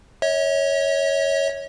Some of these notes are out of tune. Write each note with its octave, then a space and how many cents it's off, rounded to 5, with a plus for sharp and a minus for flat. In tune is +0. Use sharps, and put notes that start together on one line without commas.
C#5 +0 E5 -45